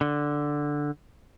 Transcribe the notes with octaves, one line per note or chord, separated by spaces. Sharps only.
D3